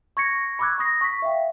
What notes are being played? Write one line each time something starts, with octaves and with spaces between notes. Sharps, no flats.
C#6 G#6 A#6 C#7
B5 C#6 D6 E6 F#6 G#6
B5 D#6 A#6 C7
C#6 B6
E5 F5 G5